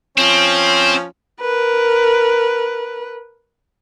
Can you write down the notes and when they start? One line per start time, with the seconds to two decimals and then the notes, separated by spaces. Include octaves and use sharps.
0.18 F3 C4 C#4
1.41 A#4 B4